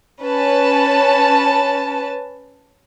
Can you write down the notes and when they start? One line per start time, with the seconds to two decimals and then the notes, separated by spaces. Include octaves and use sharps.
0.23 C#4 B4 A5